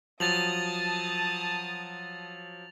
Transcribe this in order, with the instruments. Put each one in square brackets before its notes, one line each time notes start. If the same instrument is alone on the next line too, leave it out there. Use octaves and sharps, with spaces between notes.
[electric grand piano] F3 F#3 [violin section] A5 D#6 [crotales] A6 F7 F#7